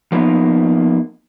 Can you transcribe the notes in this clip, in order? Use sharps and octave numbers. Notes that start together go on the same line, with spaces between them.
F3 A#3 B3 D#4